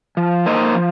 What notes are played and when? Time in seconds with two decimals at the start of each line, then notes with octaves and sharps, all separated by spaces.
0.17 F3
0.46 A#3 D#4 C5 D#5
0.75 F3